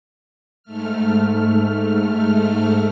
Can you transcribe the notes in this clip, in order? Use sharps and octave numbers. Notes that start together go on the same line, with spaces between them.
G#2 A3 F6